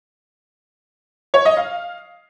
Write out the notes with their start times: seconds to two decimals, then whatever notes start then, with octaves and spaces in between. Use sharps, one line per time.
1.34 C#5
1.45 D#5
1.57 F5